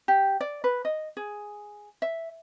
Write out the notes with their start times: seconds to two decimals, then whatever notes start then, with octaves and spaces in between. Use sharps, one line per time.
0.08 G4
0.41 D5
0.64 B4
0.85 D#5
1.17 G#4
2.02 E5